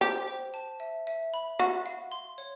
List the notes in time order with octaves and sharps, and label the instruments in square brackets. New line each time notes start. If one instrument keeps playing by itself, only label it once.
[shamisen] G4 [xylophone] C5
[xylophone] C5
A5
E5
E5
B5
[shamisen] F#4 [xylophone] F5
[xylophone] F5
C6
C#5